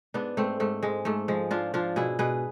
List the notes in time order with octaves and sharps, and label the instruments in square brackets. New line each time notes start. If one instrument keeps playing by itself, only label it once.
[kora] G#2 B3 D4
G#2 A3 C4
G#2 A3
G#2 G#3
G#2 A3
F3 G#3
F3 D4 F4
F3 D4 F4
B2 E4 G#4
B2 G#4 B4